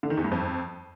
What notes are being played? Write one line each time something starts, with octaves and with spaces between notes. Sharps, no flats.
D3
D#3
E2
G2
F2